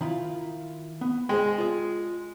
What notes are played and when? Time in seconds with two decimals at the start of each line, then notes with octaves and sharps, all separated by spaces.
0.01 D#3 E4 F4
1.01 B3
1.29 G#3 C5 G5
1.58 F4 G#4